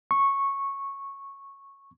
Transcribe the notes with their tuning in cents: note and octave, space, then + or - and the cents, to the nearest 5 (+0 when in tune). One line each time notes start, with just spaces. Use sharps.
C#6 -10